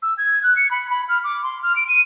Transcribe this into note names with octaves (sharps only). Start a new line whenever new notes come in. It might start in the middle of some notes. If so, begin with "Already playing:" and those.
E6
G#6
F#6
C#7
B5
B5
F6
D6
C6
F6
D7
D#7